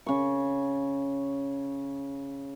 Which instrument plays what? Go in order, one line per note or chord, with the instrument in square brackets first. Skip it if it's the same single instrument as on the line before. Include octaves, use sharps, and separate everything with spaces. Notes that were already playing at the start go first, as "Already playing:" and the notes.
[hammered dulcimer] C#3 C#6